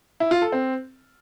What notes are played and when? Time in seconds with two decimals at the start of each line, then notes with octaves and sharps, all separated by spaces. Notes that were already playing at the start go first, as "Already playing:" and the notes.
0.20 E4
0.31 F4
0.42 A4
0.52 C4